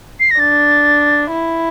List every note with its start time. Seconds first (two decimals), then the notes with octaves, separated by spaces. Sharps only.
0.20 C7
0.31 A#6
0.39 D4 A6
1.32 E4